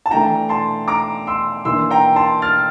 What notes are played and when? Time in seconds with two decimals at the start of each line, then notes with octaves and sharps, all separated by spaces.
0.06 A5
0.11 E3 A3 D4 G5 A#5
0.49 A5 C6
0.88 A#5 D6
1.27 C6 E6
1.65 E3 A#3 D4 C6 E6
1.91 G5 A#5
2.16 A5 C6
2.42 F6 A6